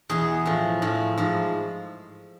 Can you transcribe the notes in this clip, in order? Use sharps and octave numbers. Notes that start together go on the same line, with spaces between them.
E2 B2 G#4
A2 F3
A2 F3
G#2 F3